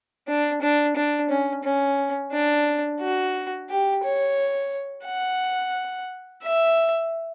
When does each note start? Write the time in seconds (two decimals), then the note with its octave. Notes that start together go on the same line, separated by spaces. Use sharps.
0.28 D4
0.62 D4
0.96 D4
1.29 C#4
1.64 C#4
2.32 D4
3.00 F#4
3.69 G4
4.04 C#5
5.06 F#5
6.43 E5